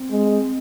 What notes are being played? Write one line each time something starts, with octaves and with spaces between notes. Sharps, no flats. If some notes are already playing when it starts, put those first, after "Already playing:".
Already playing: C4
G#3